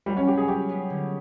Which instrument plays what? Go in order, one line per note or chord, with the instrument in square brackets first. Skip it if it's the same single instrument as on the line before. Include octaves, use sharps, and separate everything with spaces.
[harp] F#3 [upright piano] G3
[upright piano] C#4
[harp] F#3 [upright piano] G4
[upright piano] G#4
[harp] F#3 [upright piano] G4
[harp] B3
D3